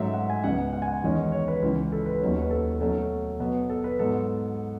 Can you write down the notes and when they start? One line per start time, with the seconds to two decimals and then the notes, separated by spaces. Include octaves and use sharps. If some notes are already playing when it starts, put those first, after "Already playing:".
Already playing: G#2 F#3 A3 C#4 E5
0.14 F#5
0.30 G#5
0.44 C#2 C#3 G#3 B3 F#5
0.73 F#5
0.82 G#5
0.88 F#5
1.02 E2 D#3 G#3 C#4
1.32 C#5
1.48 B4
1.62 C#2 C#3 E3
1.92 A4
2.06 B4
2.21 D#2 D#3 F#3 C#4
2.42 B4
2.51 A4
2.80 B2 F#3 A3 C#4
3.40 B2 F#3 B3
3.70 A4
3.84 B4
3.99 G#2 F#3 B3 A4